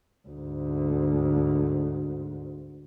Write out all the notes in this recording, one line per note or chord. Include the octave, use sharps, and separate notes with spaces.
D2 G#2